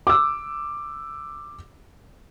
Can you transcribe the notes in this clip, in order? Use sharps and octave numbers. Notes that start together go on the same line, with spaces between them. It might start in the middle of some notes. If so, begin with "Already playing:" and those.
D6 E6